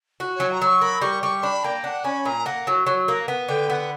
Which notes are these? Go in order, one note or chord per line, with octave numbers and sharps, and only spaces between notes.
F#4
F#3 C#5
A#5
F#3 C#6
A#3 B5
G3 C#6
G3 C#6
D4 B5
A#3 G5
D4 F#5
C#4 B5
A#2 A#5
A#3 F#5
F#3
F#3
A#3
B3
D3 G5
B3 F#5